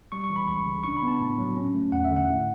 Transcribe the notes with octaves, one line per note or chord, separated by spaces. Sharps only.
G3 C#6
C#6
E3
B5
C#2 C#6
C#3
D4 C#6
B5
B3
A5
A2
F#3
C#4
A3
E2 F#5
E5
D3
F#5
A2